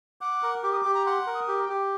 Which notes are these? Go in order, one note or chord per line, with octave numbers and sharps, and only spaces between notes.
F#5 D6
A#4
G4 D6
D#6
G4 D6
A#5
F#5 C6
A#4
D#6
G4
G5
G4